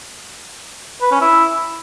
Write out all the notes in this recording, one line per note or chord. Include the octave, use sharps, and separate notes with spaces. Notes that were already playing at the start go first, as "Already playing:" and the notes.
B4
C#4
E4